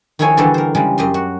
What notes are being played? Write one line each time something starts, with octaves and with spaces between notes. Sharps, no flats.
D#3 F3 E4 G#4 C#5 G#5
D3 E3 G3 F#4 G4 A4
A#4 C5
C#3 G3 G#3
F#2 G4 D#5 C6
F#4